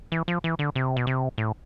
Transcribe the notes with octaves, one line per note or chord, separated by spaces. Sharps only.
E3
F3
E3
D3
C3
B2
C3
A2